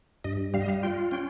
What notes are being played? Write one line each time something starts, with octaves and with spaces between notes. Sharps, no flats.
G2 D#5
G3 F5
D#5
F5
F4 G5
C#4 G5